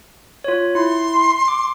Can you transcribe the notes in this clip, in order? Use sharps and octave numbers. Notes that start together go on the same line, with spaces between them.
F4 C#5
E4 C6
D6